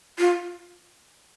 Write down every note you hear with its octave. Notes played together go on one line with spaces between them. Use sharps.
F4